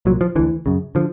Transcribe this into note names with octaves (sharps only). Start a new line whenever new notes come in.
C2 A#2 F#3
F3
D2 D3 E3
F#2 C#3
D3 F3